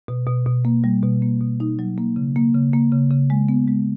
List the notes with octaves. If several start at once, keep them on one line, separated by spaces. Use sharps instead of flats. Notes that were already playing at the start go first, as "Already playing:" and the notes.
B2
B2
B2
A#3
G3
B2
A#3
B2
D#4
F#3
A#3
C#3
A#3
C#3
A#3
C#3
C#3
G#3
B3
G#3